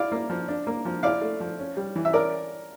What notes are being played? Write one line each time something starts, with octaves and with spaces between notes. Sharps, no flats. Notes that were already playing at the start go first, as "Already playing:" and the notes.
Already playing: E4 D5 F5
A#3
F3
D4
A#3
F3
E4 D5 F5
A3
F3
C#4
G3
E3
E5
C#4 A#4 D5